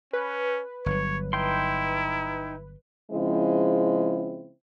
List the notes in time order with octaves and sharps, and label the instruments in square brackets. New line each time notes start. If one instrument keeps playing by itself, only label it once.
[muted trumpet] C#4 [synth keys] B4
[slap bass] G1 F#3 [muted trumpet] C#5
[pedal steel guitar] D#4 G5 C6 [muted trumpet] E4
[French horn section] C#3 F3 G#3 C4 E4